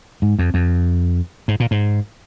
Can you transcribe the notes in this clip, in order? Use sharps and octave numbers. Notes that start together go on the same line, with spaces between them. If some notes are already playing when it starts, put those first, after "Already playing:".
G#2
F2
F2
G#2
A#2
G#2